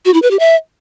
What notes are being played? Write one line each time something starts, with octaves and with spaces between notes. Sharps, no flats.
F#4
E4
B4
G4
E5